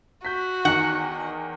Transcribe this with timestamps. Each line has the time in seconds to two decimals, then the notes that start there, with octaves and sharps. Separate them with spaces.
0.25 F#4 G6 B6
0.65 E2 D#3 F#5